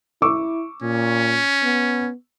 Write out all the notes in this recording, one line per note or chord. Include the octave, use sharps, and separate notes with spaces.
E4 C#6 D6 E6
A#2 C#4
B3